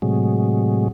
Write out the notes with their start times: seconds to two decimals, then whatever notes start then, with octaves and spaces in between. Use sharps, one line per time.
0.02 A2 C3 F#3 G#3